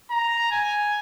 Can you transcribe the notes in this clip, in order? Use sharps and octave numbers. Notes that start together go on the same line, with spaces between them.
A#5
G#5